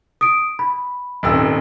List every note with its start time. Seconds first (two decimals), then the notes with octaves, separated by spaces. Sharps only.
0.21 D#6 D7
0.59 B5
1.23 D#1 G#1 E6